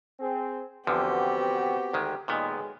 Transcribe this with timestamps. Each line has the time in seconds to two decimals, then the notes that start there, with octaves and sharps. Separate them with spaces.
0.20 C4 G#4
0.87 E2 D3 F3 B3 C4 F#4 G4
1.93 D2 D#3 G#3
2.28 B1 A#2 D#3 G#3 B3